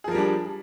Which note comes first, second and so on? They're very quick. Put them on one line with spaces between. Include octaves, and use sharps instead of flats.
G#4 F3 A#4 G3 D4